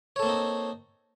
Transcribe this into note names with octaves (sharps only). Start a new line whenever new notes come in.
A#3 C4 D#4 A4 C#5